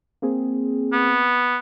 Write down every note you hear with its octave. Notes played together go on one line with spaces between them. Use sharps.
A#3 C4 G#4
B3